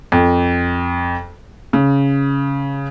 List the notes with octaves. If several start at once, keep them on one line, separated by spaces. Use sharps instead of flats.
F2
C#3